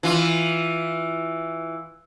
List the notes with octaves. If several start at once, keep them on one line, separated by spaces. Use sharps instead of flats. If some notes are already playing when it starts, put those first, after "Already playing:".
E3 F4